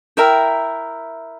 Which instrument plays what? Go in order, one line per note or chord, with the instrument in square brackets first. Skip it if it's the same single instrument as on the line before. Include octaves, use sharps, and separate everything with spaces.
[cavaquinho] E4 A#4 E5 G5